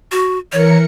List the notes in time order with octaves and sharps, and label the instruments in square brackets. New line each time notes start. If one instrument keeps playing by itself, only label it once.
[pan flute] F#4
[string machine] E3 A#4 C#7 [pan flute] C#5